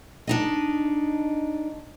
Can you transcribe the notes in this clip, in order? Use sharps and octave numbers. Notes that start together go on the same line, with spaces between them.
D4 D#4 D#5